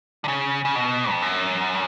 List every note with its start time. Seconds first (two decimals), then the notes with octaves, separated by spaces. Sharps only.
0.24 D3
0.28 C#3
0.65 C#3
0.75 B2
1.11 F2
1.22 F#2